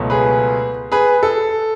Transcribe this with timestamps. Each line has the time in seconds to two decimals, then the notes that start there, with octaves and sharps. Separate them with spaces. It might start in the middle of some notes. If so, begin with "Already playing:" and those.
Already playing: C#2 B2 F#3 A3
0.10 G#4 B4
0.92 G#4 B4
1.23 A4